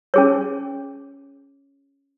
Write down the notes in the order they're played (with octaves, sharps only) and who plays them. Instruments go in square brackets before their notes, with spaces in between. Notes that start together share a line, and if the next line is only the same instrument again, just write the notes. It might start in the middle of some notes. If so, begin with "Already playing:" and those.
[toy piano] C#4 G#4 C#5